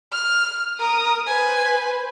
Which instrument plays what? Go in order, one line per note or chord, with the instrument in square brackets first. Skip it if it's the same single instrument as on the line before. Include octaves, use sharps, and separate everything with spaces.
[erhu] F6
[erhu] A#4 [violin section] D#6
[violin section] B4 C5 [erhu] G#5